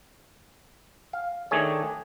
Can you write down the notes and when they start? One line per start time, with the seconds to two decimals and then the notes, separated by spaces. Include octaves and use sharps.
1.13 F5
1.51 D#3 A3 D4 G#4 C#5